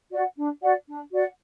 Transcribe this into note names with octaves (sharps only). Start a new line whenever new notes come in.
F#4 D5 F#5
D4
F#4 D5 F#5
D4
F#4 D5 F#5